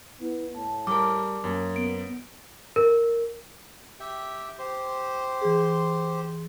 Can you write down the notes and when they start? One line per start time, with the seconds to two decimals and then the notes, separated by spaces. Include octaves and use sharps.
0.20 B3 E4
0.55 A2 A5
0.87 G3 G4 A#4 A5 D6
1.44 F#2 A#3
1.76 B3 D7
2.76 A#4
4.00 G4 E5 G5
4.59 G4 C5 C6
5.41 E3 G#4